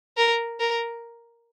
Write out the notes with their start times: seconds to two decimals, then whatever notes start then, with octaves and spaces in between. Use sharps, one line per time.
0.17 A#4
0.60 A#4